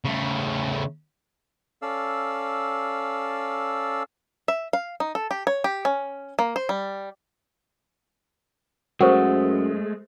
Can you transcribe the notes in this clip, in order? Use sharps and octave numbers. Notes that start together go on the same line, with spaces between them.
C#3 A3
C#4 A4 D5 F5 E6
E5
F5
D#4
A4
G4
C#5
G4
C#4
A#3
C5
G3
F#2 G#3 A3 F#4 A#4 C5